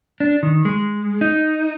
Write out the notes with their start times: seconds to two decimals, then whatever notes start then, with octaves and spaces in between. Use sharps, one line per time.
0.20 D4
0.43 D#3
0.65 G#3
1.21 D#4